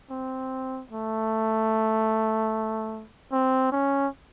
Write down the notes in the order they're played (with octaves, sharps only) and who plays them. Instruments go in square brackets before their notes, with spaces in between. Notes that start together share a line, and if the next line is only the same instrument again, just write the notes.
[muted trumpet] C4
A3
C4
C#4